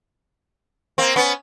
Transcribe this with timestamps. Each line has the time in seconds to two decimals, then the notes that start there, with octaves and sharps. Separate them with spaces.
0.98 A#3 C4
1.16 B3 C#4